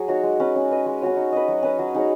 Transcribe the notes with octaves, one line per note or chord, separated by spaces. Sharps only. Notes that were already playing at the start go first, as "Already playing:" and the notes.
Already playing: F#3 G#4
D#4 F#4 C#5
G#3
C#4 B4
C#4
B4 D#5
G#3
C#4 F#4 C#5
D#4
B4 D#5
F#3
C#4 B4
F#3
D#4 G#4 C#5